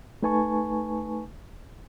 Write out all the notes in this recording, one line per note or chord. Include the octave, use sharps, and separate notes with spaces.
A3 D#4 B4 G#5 A5 C#6